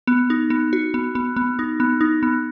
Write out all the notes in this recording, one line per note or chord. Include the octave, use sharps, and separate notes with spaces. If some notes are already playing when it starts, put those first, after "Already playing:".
B3
D#4
B3
F#4
B3
B3
B3
D#4
B3
D#4
B3